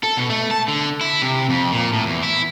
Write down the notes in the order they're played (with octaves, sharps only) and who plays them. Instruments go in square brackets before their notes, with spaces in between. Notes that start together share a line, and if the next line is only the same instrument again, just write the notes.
[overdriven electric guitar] A4
B2
A3
A5
D3
E4
C3
F2
A#2
A2
E2
E4